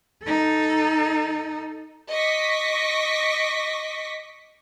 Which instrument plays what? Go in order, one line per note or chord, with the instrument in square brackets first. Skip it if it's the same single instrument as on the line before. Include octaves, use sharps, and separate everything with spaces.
[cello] D#4 A4
[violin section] D#5 C#6 D6 A#6 B6